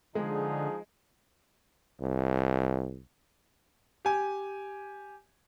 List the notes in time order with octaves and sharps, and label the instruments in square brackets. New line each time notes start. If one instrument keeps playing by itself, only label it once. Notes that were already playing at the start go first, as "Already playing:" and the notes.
[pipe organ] D3 [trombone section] F3 D#4 G#4 [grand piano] G#3
[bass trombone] C2
[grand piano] G4 G#5